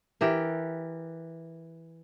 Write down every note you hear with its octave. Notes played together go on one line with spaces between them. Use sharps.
E3 G4 A#4